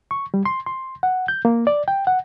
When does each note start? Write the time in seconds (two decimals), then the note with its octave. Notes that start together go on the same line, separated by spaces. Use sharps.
0.11 C#6
0.34 G3
0.46 C6
0.66 C6
1.03 F#5
1.28 G6
1.45 A#3
1.67 D5
1.88 G5
2.07 F#5